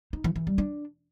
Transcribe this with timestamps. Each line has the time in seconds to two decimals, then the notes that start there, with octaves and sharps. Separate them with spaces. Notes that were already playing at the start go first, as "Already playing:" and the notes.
0.13 D#4
0.24 E3
0.36 E3
0.47 G3
0.58 D4